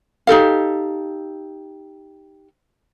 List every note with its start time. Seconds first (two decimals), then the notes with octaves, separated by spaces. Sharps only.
0.27 D#4 G4 A4 F5